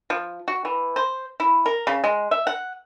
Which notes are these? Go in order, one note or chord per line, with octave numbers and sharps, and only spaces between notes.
F3
F#4
E3
C5
E4
A#4
C#3
G#3
E5
F#5